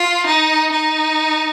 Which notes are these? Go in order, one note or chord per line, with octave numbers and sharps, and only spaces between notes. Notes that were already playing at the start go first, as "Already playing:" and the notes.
Already playing: F4
D#4
D#4